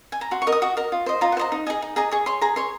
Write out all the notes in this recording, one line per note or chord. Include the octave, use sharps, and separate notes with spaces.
G#5
A#5
F#4 C6
C#6
A#4 D#5
D#6
F#4 C#6
A#4 D#5
F4
C5 D#5
F4 A#5
F#5
C5 D#5 A#5
D#4
G#4 D#5 G#5
D#4
G#4 D#5 A#5
G#4 C#6
C#5 C6
G#4 A#5
C#5 C6